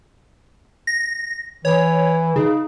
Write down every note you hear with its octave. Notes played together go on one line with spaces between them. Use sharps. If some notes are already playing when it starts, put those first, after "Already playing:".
A#6
E3 C#5
C#3 D#4